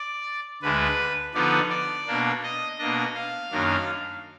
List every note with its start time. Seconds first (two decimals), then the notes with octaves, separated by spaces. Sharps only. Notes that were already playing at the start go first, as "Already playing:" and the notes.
Already playing: D5
0.62 D2 D3 G#3 D4 B4
1.34 D3 F3 B3 D#4 D5
1.70 D5
2.07 B2 A#3 D4
2.43 D#5
2.79 B2 A#3 D4 D#5
3.15 F5
3.52 F#2 D#3 F#3 A#3 D4